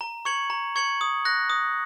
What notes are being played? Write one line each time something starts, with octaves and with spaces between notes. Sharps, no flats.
A#5
C#6 G#6 C#7 F#7
A#5
C#6 G#6 C#7 F#7
D#6
F#6 A#6
D#6